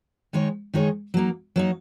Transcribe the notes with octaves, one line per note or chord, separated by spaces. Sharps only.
D#3 G#3 D#4 G#4 C#5
D#3 G#3 D#4 G#4 C#5
F#3 A#3 D#4
F#3 A#3 D#4